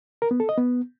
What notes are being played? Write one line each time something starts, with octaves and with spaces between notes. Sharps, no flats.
A#4
B3
A4
D#5
B3